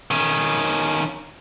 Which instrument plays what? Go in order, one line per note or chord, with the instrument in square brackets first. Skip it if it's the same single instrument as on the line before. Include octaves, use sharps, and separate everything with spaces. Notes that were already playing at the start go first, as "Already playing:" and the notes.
[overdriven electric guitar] D#3 C#4